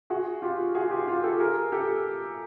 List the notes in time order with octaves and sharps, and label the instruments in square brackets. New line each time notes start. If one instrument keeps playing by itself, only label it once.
[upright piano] F#4 G#4
F4 G4
F#4 G#4
F4 G4
F4 G4
G4 A4
G#4 A#4
G4 A4